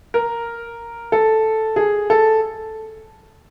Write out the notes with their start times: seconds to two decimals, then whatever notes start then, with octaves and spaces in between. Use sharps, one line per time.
0.14 A#4
1.12 A4
1.76 G#4
2.10 A4